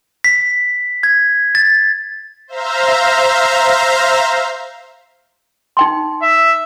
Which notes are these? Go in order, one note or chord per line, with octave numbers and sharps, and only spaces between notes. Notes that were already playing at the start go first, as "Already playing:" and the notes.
B6
G#6
A6
C5 E5 F5 A#5
D#4 G5 C6
E5